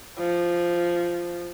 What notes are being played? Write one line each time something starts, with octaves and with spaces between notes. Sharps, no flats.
F3